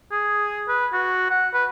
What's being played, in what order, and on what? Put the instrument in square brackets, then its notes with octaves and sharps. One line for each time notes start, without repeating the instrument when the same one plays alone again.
[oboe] G#4
B4
F#4
F#5
B4